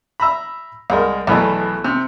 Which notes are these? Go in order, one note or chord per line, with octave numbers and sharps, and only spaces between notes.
E5 A#5 B5
C2 G#3 A#4
B1 E2 B2 E3 A3
C3